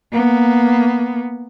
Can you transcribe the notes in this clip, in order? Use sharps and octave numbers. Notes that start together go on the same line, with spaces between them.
A#3 B3